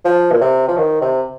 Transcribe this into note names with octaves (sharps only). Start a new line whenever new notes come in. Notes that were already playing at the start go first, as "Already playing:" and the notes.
F3
A#2
C3
F3
D#3
C3